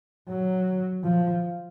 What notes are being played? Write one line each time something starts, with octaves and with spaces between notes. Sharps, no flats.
F#3
F3